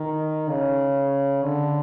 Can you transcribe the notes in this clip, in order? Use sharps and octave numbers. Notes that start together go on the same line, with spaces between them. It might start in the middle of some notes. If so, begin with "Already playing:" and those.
Already playing: D#3
C#3
D3